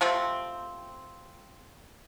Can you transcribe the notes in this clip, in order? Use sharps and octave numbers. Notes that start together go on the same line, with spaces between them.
C3 F3 A3 C4